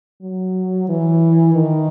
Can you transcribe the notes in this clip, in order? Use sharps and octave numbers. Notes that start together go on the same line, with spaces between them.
F#3
E3
D#3